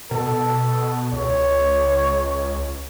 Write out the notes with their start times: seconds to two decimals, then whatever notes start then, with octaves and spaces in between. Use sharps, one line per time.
0.11 B2 A4
1.13 C#2 C#5